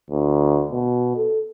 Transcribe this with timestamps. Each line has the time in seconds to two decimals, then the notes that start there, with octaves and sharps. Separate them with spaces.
0.10 D2
0.72 B2
1.16 A4